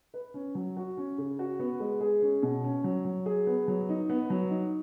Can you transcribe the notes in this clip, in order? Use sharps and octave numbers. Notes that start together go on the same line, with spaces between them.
B4
C#4
F#3
F#4
C#4
C#3
F#4
B3
G#3
G#4
C#4
B2
C#4
F#3
F#3
G#4
B3
F#3
D#4
B3
F#3
D#4